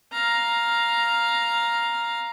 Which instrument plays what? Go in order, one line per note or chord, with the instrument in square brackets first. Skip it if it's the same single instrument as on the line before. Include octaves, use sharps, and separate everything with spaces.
[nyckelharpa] F5 A#5